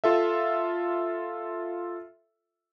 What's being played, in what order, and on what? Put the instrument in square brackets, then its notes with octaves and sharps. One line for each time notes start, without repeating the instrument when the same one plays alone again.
[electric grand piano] F4 A4 E5